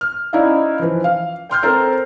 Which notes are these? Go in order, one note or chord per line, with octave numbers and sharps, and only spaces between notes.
F6
C#4 D#4 E4 D5 D#5 F5
E3 F3
F5
G5 C6 F6 G6
C4 A4 A#4 C5